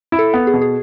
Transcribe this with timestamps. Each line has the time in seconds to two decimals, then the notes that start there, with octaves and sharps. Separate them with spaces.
0.12 E4
0.19 A4
0.34 B3
0.47 G#4
0.54 B2
0.61 G#4